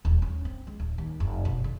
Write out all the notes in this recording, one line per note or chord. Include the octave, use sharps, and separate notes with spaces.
D#1
C#4
C4
G#3
D1
D#2
F1
B2
D3